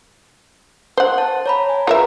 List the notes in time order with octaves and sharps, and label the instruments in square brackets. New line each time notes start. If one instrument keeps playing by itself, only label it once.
[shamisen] C5 F#5
[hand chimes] A5
C#5 A#5 B5
G#5
[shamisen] F4 A#4 E5 [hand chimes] G#4 B4